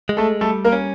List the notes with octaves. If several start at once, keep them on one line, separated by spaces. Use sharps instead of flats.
G#3
A3 A4
G3 A3 A4
A#3 A#4
C#4